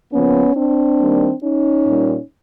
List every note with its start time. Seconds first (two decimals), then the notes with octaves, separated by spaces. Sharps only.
0.12 C#3 F3 A#3 B3 C#4
0.55 C4 D4
0.99 D#3 G3 A#3
1.42 C#4 D#4
1.85 A#2 G3 A#3